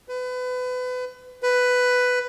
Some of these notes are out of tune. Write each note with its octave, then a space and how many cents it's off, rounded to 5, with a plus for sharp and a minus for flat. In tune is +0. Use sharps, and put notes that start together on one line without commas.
B4 +30
B4 +10